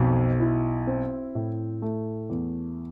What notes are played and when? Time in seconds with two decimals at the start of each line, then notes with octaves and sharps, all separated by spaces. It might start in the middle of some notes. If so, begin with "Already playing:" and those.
Already playing: B1 F2
0.40 E4
0.87 C4
1.35 A2
1.82 A3
2.30 E2